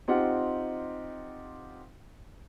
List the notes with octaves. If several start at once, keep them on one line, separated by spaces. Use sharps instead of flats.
C4 D#4 F4 G4 F#5